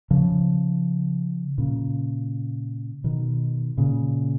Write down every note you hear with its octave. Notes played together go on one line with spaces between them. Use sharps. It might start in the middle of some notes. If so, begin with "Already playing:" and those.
C#3 F3
A#2 C#3
B2 D#3
A#2 C#3